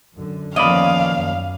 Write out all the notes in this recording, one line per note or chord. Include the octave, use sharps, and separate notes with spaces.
F#2 D3
D#2 F3 B3 C#4 D5 D#5 F5 B5
F#2